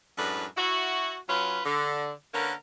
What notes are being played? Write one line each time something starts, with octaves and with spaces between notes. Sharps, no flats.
F#2 A2 G#3 D4 B4
E4 F#4
F#3 C#4 F4 B4
D3
D3 A#3 C#4 A#4 B4